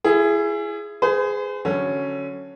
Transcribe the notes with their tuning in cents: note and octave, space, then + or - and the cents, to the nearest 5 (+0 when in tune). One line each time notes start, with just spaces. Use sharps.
E4 +30 G#4 +0
G#4 +0 C5 -45
D3 +0 F#3 +0 C#4 +0